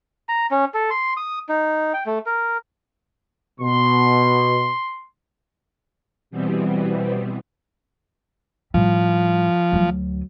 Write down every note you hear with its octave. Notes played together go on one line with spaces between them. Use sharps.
A#5
C#4
A4
C6
D#6
D#4
G5
A3
A#4
B2 C6
B2 E3 G3 B3 C4
A2 F3 G3
D2 F#3